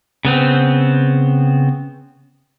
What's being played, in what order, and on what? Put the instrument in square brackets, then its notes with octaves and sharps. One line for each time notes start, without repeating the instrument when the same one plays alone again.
[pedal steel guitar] C#3 B3 C4